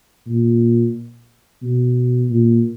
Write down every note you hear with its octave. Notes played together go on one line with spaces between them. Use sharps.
A#2
B2
A#2